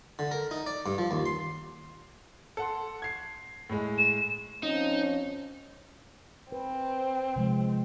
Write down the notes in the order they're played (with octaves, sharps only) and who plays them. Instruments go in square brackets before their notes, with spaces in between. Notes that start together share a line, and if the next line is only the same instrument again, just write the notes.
[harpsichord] D3
A#4
D#4
D5
G2
F3
D#2
C6
[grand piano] A4 F#5 C6
G#6 C7
A2 G#3
[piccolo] E7
[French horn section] F3 C4 C#4 [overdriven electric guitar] D#4
[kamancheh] C4 [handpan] B4
[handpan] C3 F3 G#3